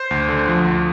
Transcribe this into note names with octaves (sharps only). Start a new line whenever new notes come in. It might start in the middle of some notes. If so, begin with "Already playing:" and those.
Already playing: C5
D2
D3
F3
D2